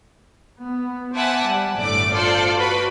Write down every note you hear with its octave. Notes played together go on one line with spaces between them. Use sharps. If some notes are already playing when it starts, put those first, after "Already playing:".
B3
C5 E5 F#5 G#5 A5 D6
G3
G1 A2 A3 D5 D6
F4 A4 C5 D5
F#4 B4 B5